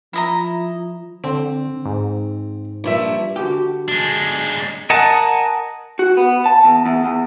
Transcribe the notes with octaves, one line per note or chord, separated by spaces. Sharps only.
F3 E4 D#5 A#5
D3 C4
G#2
A#1 G2 E5
D3 F#4 G4
G#3 D4
A#4 D#5 F#5 G#5 A5
F#4
B3
A5
E2
E2
E2